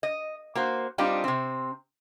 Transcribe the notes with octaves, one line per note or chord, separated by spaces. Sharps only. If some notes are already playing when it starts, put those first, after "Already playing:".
D#5
A#3 F#4 C5
G3 C4 D4 D#4 F4 G4
C3 C4